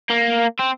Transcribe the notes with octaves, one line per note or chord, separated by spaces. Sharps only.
A#3
C4